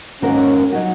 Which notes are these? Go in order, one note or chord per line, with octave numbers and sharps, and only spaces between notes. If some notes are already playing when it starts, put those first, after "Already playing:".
G#2 D#3 A#3 C#4 F#4 A#4
F#3 D#4 F#4